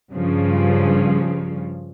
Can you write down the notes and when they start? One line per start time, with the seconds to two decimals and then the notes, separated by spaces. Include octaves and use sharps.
0.12 G2 C#3 F3